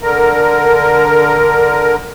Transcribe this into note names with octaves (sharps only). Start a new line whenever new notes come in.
D3 A#4